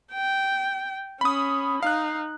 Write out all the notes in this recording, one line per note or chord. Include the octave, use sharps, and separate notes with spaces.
G5
C#4 B5 D#6
D#4 F5 F#6